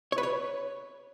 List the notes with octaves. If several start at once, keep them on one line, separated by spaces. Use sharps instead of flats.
C#5
B4
C#5